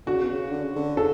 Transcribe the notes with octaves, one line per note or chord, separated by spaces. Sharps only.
D3 F#4
C#3
B2
C#3
D3
C#3
D3
C#3 A4